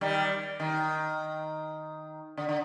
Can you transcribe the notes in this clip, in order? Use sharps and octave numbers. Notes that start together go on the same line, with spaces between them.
D#3 G3
D#3
D3
D3